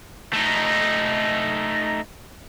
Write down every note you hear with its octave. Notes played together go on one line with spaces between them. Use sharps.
A3 D#4